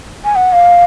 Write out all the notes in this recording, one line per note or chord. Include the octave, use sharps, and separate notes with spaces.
G#5
F#5
F5